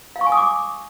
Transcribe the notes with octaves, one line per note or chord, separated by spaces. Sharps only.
F5
C#6
G#5
D#6
D6